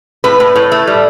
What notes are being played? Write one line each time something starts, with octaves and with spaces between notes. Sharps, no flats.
A2 B4
A2
A2
A3
G3